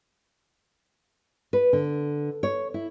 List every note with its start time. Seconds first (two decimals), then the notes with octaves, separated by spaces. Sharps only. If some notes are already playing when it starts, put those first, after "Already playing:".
1.53 B4
1.73 D3
2.43 C#5
2.74 E4